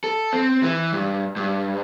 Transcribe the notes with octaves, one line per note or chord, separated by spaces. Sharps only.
A4
C4
E3
G2
G2